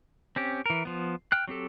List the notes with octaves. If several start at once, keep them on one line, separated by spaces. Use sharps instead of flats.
C4 C#4 G4
E3 A#4
F3 B3
G5 F6 F#6
F#3 C4 G4 A4